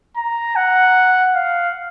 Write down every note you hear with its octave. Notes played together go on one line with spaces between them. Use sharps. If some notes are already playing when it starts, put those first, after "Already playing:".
A#5
F#5
F5